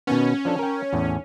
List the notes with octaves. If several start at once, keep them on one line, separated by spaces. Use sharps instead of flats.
B2 D#3 B3 C#4
F3 D4 A4
A#4 G5
E2 A2